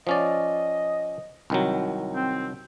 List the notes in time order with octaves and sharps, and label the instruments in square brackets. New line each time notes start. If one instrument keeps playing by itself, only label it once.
[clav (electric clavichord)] F3 C#4 D5 [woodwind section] D#5
[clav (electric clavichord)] C2 D#3 F#3
[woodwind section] C4